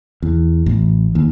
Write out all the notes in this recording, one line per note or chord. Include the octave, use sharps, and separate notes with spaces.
E2
A1
D#2